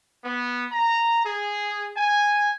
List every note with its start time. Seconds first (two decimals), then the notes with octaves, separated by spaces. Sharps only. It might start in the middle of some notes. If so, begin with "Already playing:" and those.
0.25 B3
0.71 A#5
1.24 G#4
1.96 G#5